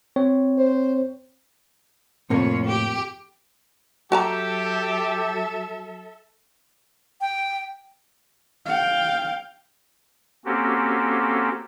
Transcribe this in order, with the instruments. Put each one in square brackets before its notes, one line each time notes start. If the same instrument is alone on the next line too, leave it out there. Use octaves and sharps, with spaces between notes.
[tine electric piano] C4 C#5
[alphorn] C5
[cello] F2 C#5 [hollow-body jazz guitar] A2 C3 A#3
[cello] G4
[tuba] F#3 [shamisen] F#4 A5 A#5 [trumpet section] G4 [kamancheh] A4 E5
[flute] G5
[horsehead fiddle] F5 G5
[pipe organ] A#3 C4 C#4 F#4 G4 A4